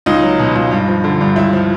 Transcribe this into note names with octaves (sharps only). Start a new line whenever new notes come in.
C#2 D#4
F#3
B2
C#2
G2
F3
D3
G2
C#2 E4
F3